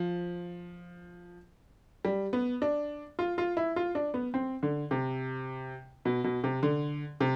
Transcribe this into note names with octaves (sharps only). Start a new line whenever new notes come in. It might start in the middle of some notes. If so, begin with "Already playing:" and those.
Already playing: F3
G3
B3
D4
F4
F4
E4
F4
D4
B3
C4
D3
C3
B2
B2
C3
D3
C3